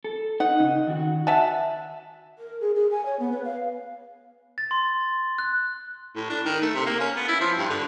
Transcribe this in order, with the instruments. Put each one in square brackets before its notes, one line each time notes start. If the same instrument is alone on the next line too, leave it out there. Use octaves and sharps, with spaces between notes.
[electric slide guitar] A4
[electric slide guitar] D#4 [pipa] F#5
[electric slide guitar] C#3 D#4
D#3 F#4
[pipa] E5 G#5 A5 [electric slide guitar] F#5
[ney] A#4
G#4
G#4
G#5
C#5
B3
B4
F5
[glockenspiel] A6
C6
F#6
[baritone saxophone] A2
D4
D#3
A3
C3
A#3
C#4
B3
E4
F3
G2
D3